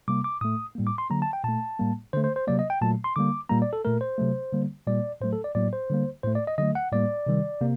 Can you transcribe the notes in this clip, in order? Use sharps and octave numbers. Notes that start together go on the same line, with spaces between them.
C3 G3 A#3 D6
D6
A2 A3 D#6
A2 G3 A#3
D6
C6
D3 F#3 A#3 A#5
A5
G5
A#2 A3 A5
A2 G3 A#3
D3 A3 C5
C5
C5
C3 F#3 A#3 D5
D#5
G5
A#2 F#3 A3 A5
C6
D3 G3 A#3 D6
A#2 G3 A#3 A#5
D5
A4
A#2 A3 A#4
C5
C3 F#3 A3
D3 G3 A#3
A#2 G3 A#3 D5
A2 F#3 A3 C5
A4
D5
A2 F#3 A#3 D5
C5
D3 G3 A#3
A2 A3 C5
D5
D#5
D3 F#3 A3 D#5
F#5
A2 G3 A#3 D5
C3 D#3 G3
C3 A#3